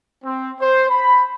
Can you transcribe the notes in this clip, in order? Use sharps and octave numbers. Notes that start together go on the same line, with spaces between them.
C4
C5
B5